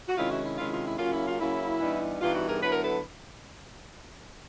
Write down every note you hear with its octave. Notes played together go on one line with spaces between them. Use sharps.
F#4
C3 D#3 G#3 C#4 E4 F4
E4 F#4
E4
C3 D#3 G#3 C#4 E4 F4
F4
E4
C#3 F#3 A#3 C#4 F4
E4
F4
C#3 F#3 A#3 C#4 E4
G2 E3 G3 B3 D#4
G2 E3 G3 B3 D#4 F4
E4 F#4
G#4 A#4
D3 F#3 B3 E4 B4
A#4
A4 B4